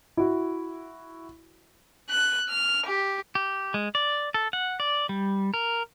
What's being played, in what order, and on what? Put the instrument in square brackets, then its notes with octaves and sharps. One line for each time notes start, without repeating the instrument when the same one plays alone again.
[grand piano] E4 F#4
[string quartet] F#6
F6
G4
[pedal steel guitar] G4
G#3
D5
A4
F#5
D5
G3
A#4